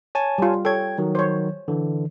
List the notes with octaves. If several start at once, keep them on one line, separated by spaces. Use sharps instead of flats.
C#5 G#5 A5
G3 F4
A4 C#5 G5 G#6
D#3 F#3
C5 C#5
D3 E3